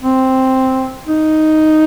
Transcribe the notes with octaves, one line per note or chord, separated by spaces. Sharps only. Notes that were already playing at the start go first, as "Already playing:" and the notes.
C4
D#4